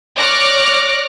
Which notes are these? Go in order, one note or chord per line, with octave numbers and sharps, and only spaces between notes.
C#5 D5 D6 F6 F#6 A#6